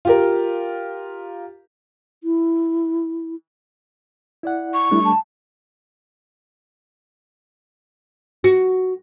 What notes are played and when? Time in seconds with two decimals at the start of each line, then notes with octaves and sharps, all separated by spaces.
0.05 F4 G4 A#4
2.24 E4
4.43 E4 D5 F#5
4.74 C#6
4.91 G3 A3 D4 E4
5.05 A5
8.44 F#4